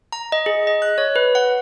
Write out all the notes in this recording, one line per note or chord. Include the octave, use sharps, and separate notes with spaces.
A#5
D#5
G#4
D#5
F#6
C#5
B4
F#5